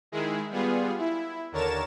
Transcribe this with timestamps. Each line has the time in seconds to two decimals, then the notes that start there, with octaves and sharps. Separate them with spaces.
0.12 D#3 G#3 E4 G#4
0.50 G3 B3 F4 G#4
0.98 E4
1.52 D#2 D3 A#4 C#5 A6 E7